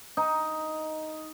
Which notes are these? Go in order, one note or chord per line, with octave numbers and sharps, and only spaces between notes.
D#4